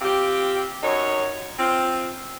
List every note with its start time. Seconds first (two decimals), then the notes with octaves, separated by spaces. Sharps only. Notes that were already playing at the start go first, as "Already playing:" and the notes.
0.01 C4 F4 G4
0.82 F#2 D#4 C#5
1.59 C4 F4